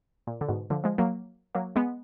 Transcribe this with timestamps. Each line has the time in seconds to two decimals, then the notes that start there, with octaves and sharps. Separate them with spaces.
0.27 A#2
0.41 D3
0.48 G#2 B2
0.70 D3 F3
0.84 F3 G#3
0.98 F#3 A#3
1.55 F#3 A#3
1.76 G#3 B3